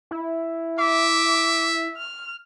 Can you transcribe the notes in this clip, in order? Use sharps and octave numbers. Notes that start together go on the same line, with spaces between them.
E4
E5 D6
F6